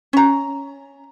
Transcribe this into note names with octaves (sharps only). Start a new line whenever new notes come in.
C#4 A#5